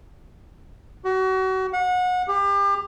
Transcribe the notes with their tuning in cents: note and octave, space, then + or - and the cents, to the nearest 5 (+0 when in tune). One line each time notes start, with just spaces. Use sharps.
F#4 +30
F#5 -30
G4 +30